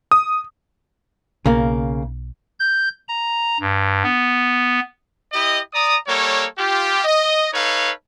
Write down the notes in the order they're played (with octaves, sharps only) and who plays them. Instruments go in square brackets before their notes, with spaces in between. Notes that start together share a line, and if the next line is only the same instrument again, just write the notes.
[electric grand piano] D#6
[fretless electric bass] B1 [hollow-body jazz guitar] C#3 A#3
[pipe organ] G6
A#5
G2
B3
[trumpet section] E4 G4 D#5
D5 A#5 D#6
G3 A#3 A4 C#5
F4 G4
D#5
D#4 A4 B4 C#5 F5